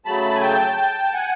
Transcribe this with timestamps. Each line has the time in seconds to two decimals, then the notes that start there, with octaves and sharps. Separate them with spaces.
0.05 C#3 F#3 A3 A5 B5
0.35 G#5
0.41 G5 A5
0.77 G5 A5
1.04 A5
1.13 F#5 G#5